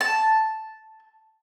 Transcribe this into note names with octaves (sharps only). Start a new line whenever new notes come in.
A5